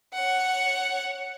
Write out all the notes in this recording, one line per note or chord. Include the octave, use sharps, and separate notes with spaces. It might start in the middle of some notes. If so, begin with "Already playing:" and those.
C#5 F#5